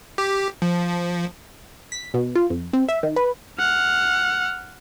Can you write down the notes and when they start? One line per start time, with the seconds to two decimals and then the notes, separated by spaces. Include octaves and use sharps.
0.18 G4
0.62 F3
1.92 B6
2.14 B2
2.35 F4
2.50 F2
2.73 C4
2.89 E5
3.03 D#3
3.16 B4
3.59 F#5 F6